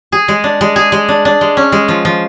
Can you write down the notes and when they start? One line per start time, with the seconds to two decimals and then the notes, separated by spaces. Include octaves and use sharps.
0.12 G#4
0.28 G#3
0.44 D4
0.61 G#3
0.76 G#4
0.92 G#3
1.09 D4
1.25 D4
1.41 G#3
1.57 C#4
1.72 G#3
1.88 F3
2.05 F3